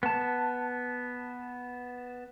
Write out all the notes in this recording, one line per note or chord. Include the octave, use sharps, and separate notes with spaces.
B3 A5